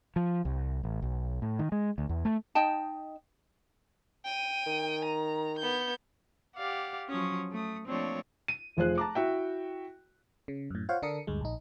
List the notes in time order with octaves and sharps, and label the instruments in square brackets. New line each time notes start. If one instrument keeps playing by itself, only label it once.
[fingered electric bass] F3
C2
A1
B1
A2
D#3
G#3
D2
E2
A3
[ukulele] D#4 D#5 G5 A5
[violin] G5 D#7
[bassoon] D#3
[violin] A#5
B3 G6
[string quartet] G4 D5 F5 F#5
F3 F#3 C#4 C#6 D#6
A3 D#6
F3 A3 A#3 C4 D4 C#5
[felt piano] D#7
F1 F3 G#4 C5 F#6
A5 A#5 D6
E4 F#4 E5 G5
[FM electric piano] C#3
F#2 A2
F4 C5 C#5 F5 F#5
D3 D4 A4 A#4 D#6 C#7
D2 G2 G#3
A#1 D#4